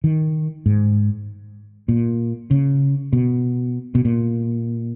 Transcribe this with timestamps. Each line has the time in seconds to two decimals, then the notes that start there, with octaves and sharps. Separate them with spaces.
0.04 D#3
0.66 G#2
1.89 A#2
2.51 C#3
3.13 B2
3.95 B2
4.05 A#2